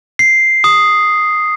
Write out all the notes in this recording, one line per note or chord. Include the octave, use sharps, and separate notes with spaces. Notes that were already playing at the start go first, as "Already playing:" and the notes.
C7
D#6